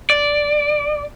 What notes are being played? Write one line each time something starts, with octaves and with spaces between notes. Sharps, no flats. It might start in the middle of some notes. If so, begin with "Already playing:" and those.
D5